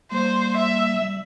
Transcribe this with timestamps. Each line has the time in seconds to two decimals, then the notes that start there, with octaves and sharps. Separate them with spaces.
0.12 G3 A#3 C5
0.57 E5
1.02 G3